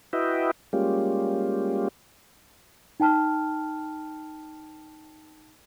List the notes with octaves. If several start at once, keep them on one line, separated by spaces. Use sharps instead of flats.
E4 F#4 B4 D#5 E5 G5
G3 G#3 A#3 C#4 F4 G4
D#4 G5 A5 F6